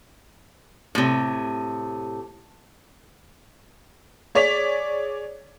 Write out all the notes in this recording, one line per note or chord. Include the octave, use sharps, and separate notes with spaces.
A2 C3
G#4 C#5 D5 B6 F7